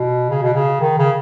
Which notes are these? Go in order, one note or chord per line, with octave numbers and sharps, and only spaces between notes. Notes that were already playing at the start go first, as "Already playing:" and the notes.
Already playing: B2
C#3
B2
C#3
D#3
C#3